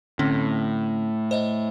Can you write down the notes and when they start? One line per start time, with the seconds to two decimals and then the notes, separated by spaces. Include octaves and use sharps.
0.19 A2 D3 C4 C#4
1.31 C5 D#5 E5